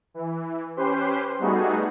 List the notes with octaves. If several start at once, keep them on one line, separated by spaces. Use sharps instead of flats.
E3
C#4 G4 B4 C5 C6
G3 A3 B3 D#4 F#4 G#4